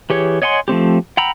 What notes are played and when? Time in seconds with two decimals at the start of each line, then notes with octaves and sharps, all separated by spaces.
0.10 E3 G4 G#4 C#5
0.42 C#5 D#5 F#5 G#5 C6
0.68 F3 A3 C4 G4
1.17 F#5 G5 A#5 B5 E6